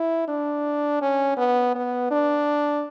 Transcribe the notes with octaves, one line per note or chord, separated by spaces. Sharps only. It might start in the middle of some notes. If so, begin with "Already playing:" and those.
Already playing: E4
D4
C#4
B3
B3
D4